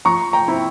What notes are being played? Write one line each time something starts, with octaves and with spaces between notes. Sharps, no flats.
F3 A#5 C#6
G5 A#5
C4 E4